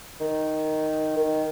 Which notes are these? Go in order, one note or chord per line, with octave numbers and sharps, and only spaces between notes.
D#3
D#3